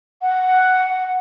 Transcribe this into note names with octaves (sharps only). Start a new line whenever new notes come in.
F#5